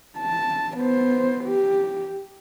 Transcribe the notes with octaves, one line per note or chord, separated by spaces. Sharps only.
A5
B3 C5
G4